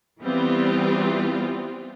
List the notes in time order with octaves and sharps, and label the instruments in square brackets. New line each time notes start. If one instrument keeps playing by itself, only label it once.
[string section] E3 G3 B3 C4 F4